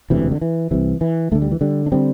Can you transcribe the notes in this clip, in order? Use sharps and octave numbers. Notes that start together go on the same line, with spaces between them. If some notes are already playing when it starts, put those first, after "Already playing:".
E1 D2 C3 E3
D3
E3
C2 C3 E3
E3
D2 D3 A3
G3
E3
D3 G3
D4
D3 G3 C4